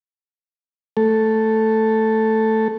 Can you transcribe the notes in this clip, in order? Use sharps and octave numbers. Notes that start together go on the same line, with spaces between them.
A3 A4